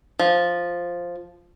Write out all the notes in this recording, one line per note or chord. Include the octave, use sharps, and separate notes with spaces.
F3